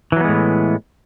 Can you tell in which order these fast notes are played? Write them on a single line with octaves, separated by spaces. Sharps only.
E3 F#3 B3 G#3 A2